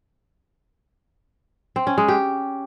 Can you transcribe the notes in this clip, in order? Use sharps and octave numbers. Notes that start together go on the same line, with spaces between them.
C4
C#4
G#3
G4